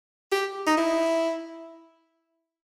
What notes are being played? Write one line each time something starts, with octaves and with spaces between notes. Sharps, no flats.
G4
D#4
E4